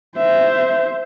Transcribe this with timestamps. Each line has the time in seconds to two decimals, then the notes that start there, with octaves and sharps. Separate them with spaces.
0.17 C5 E5